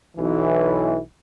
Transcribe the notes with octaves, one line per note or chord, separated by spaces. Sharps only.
B1 E3